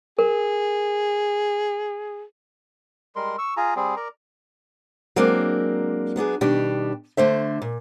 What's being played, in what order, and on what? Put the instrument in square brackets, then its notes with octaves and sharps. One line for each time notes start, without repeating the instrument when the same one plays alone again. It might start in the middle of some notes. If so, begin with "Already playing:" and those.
[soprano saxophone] G#4 [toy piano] A#4
[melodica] G3 G#3 A#4 C6
C#6 E6
F4 G#4 G#5 A#5
G3 C4 G#4
A#4 D5 A#5
[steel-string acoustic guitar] F#3 G#3 A#3 C4 D4 A#4
F#3 B3 D4 G#4
B2 D#3 G3 D4 G4
D3 A3 C5 E5
A#2